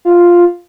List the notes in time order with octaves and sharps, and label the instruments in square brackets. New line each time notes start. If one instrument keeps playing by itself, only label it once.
[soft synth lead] F4